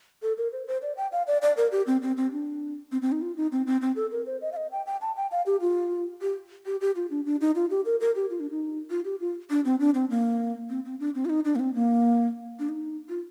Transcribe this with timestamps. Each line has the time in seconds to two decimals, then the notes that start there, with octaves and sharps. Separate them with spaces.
0.22 A4
0.38 A#4
0.52 C5
0.67 C5
0.82 D5
0.97 G5
1.12 F5
1.27 D5
1.42 D5
1.57 A#4
1.72 G4
1.87 C4
2.02 C4
2.17 C4
2.32 D4
2.92 C4
3.02 C4
3.12 D#4
3.22 F4
3.37 D#4
3.52 C4
3.67 C4
3.82 C4
3.96 A4
4.12 A#4
4.26 C5
4.41 D#5
4.52 F5
4.57 D#5
4.71 G5
4.86 G5
5.01 A5
5.16 G5
5.31 F5
5.46 G4
5.61 F4
6.21 G4
6.66 G4
6.81 G4
6.96 F4
7.10 D4
7.26 D4
7.41 D#4
7.55 F4
7.71 G4
7.86 A#4
8.01 A#4
8.16 G4
8.30 F4
8.40 D4
8.51 D#4
8.90 F4
9.05 G4
9.20 F4
9.50 D4
9.65 C4
9.80 D4
9.95 C4
10.10 A#3
10.70 C4
10.85 C4
11.00 D4
11.15 C4
11.25 F4
11.29 D#4
11.45 D4
11.56 A#3
11.60 C4
11.74 A#3
12.59 D4
12.69 D#4
13.09 F4